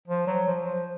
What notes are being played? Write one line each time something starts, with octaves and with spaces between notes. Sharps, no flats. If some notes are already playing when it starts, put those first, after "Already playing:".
F3
F#3
F3
F3